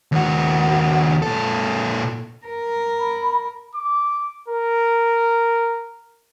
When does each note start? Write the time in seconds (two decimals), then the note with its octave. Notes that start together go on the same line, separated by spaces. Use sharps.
0.12 D#2 F#4
1.22 A#2 A4
2.46 A#4
3.00 B5
3.75 D6
4.48 A#4